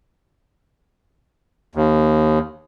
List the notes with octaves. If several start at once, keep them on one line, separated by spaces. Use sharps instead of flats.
D#2